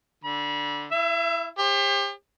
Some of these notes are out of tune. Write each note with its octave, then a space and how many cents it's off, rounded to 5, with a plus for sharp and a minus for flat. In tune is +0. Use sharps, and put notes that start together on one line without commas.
D3 +0 B5 -35
E4 +0 E5 +40
G4 +35 C5 +40